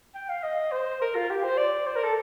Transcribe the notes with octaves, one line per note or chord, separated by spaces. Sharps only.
G5
F5
D#5
C5
A#4
F4
G4
C5
D5
C5
A#4
A4